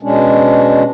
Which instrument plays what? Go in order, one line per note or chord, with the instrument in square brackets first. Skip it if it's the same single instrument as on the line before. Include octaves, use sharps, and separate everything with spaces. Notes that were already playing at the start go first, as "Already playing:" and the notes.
[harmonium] B2 G#3 C#4 D4